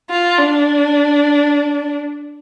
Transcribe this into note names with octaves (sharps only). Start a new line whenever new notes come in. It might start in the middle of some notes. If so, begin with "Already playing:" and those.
F4
D4